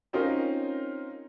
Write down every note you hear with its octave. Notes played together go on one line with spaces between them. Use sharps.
C4 C#4 D#4 F4 A#4